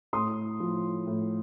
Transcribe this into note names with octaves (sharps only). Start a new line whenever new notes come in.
A2 C6 D#6
F3
A2